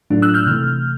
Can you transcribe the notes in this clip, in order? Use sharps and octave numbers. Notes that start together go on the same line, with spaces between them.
A2 F#3 A3 D4 F4
E6 F#6
F6 G6
C3 E3 A3